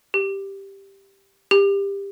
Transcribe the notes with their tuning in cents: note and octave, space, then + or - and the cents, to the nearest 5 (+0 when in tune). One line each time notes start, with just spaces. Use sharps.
G4 +0
G4 +20